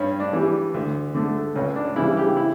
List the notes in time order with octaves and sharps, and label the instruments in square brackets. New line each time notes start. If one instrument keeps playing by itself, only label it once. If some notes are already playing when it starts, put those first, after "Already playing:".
Already playing: [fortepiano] G2 C#4
D4
E3 G3
D2
D3 A3
C#2 C#4
D4
C#3 E3 G3 E4
G4
E4